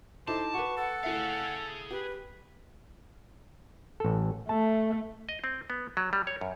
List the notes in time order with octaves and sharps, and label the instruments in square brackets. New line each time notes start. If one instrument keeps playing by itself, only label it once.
[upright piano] D#4 E4 A4 [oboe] C5 [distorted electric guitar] A5 [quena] D6
[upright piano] F#4 B4 [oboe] C#6
[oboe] A4 [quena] F#5
[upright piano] A3 E4 E5 [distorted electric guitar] G#4 F5
[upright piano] G4 [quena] B4
[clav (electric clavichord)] A1 A4
[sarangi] A3 [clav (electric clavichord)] A5
[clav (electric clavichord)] D#5
C4
B3
F#3
G3
C#5
F#2